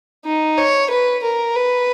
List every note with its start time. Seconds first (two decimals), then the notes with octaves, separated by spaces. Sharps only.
0.25 D#4
0.58 C#5
0.90 B4
1.23 A#4
1.56 B4